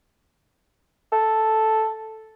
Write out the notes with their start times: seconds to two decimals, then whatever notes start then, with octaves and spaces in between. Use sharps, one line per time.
1.12 A4